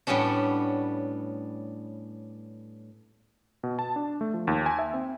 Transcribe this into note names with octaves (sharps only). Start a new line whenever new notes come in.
A2 G3 B3 C#4 D4
B2
A5
D4
A3
F3
D#2
G#5
E5
C4